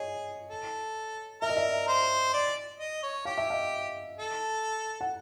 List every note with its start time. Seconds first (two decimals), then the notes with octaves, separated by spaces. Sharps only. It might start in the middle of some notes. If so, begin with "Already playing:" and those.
Already playing: G#4 C#5 D#5
0.49 A4
1.42 A#4 E5
1.49 D#5
1.56 D5 E5
1.88 C5
2.34 D5
2.80 D#5
3.03 C#5
3.25 G4 F5
3.38 E5
3.50 D#5 F5
4.18 A4
5.01 F#5